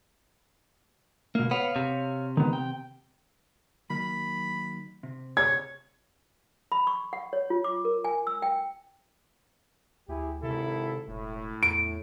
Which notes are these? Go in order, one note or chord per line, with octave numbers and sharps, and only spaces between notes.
B2 A#3
B3 C#5 F5
C3
D#3 B3
G5
D#3 F#3 A#3 B5
C3
C#5 G#6
B5
C#6
F#5
C#5
F4
D6
A#4
G#5
E6
G5
D2 E4 G4 G#4
G#1 C3 E4 A4
E1 A2
E2 D7